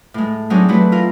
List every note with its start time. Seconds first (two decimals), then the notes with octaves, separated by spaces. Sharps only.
0.14 A2 G#3
0.50 F#3 G#3 C4 D4 D#4 G#4
0.68 E3 F#3 A3 E4 F#4
0.92 E4 F4 A#4